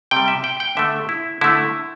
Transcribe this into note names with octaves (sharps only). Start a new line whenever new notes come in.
C3 G3 G5
E5
G5
G5
D3 A3 E5
E4
D3 A3 E4